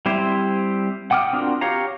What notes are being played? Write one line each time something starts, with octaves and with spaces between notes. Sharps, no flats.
G3 C4 E4 G4 C5
F#5 G5 D6 D#6 F6
C4 D4 F4 F#4 A#4
G4 C#5 F5 A#5